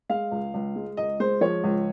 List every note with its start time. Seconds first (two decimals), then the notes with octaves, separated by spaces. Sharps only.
0.09 G#3 F5
0.32 C#2
0.54 C#2
0.76 G#3
0.97 C#2 D#5
1.20 G#3 C5
1.41 F3 C#5
1.64 C#2